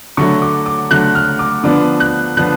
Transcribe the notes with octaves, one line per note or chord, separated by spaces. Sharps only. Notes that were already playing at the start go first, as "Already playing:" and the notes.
D3 F#3 A3 C#6
D6
D6
D3 F#3 A3 F#6
F6
D6
D3 F3 B3 D4 D6
F#6
D3 F3 B3 D4 F#6